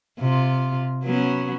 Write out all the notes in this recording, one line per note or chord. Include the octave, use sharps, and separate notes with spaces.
C3 F4
F#3 B3 C#4